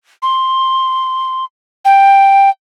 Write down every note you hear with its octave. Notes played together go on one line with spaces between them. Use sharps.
C6
G5